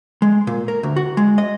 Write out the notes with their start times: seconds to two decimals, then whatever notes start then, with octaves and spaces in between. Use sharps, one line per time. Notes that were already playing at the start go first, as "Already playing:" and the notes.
0.22 G#3
0.47 A#2
0.68 A#4
0.83 D2
0.96 F#4
1.17 G#3
1.38 D#5